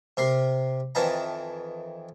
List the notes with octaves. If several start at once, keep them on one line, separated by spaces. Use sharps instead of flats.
C3 A#4 C6
F2 D#3 E3 A5 A#5